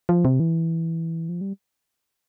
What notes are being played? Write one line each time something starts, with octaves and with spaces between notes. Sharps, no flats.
F3
C3
E3
F3
G3